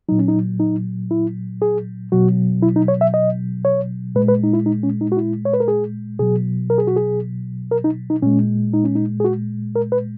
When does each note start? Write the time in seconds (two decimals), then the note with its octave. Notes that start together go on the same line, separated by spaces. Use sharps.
0.09 A#2 F#3 D#4
0.19 C#4
0.28 D#4
0.60 D#4
1.11 E4
1.62 G#4
2.12 B2 F#3 F#4
2.62 E4
2.76 D#4
2.88 C#5
3.01 E5
3.14 D#5
3.65 C#5
4.15 A#2 G#3 B4
4.28 B4
4.44 D#4
4.53 E4
4.66 D#4
4.83 C#4
5.01 D#4
5.12 F#4
5.17 E4
5.45 C#5
5.53 B4
5.60 A#4
5.68 G#4
6.19 B2 F#3 G#4
6.70 A#4
6.78 G#4
6.87 F#4
6.96 G#4
7.71 A#4
7.84 D#4
8.10 D#4
8.22 A#2 G#3 C#4
8.73 D#4
8.84 C#4
8.95 D#4
9.20 G#4
9.25 F#4
9.76 A#4
9.92 B4